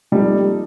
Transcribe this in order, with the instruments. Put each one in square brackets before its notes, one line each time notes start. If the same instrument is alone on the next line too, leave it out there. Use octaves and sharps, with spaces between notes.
[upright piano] C3 F3 A#3 D#4 A4 [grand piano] G3